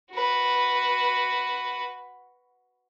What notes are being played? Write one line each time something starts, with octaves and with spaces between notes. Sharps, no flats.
F#4 B4